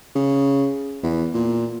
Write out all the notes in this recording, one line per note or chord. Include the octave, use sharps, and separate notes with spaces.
C#3
E2
A#2